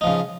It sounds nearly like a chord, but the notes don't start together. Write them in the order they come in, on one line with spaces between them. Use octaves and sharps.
D#4 F3 C#3